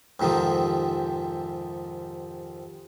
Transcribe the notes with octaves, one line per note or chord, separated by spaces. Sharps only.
F2 G#2 C3 D#3 F3